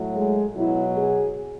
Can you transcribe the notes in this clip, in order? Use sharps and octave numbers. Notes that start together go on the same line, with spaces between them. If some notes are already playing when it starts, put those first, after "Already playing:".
Already playing: A2 F#3
G#3
B2 F#3 E4
G#4